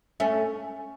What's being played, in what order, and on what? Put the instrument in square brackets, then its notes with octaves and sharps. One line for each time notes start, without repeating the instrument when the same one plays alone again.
[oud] A3 C#4